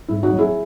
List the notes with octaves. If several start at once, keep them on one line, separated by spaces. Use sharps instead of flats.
G#2 E4
D#4 F#4
F#3
E4 G#4